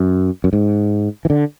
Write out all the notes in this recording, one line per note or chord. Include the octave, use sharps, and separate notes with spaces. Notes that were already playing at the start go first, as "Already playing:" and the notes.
Already playing: F#2
F#2
G#2
E3
D3